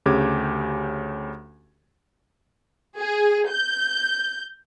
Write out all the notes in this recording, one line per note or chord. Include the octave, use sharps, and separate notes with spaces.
D2 C#3 G4 D6 G#6
G#4
G6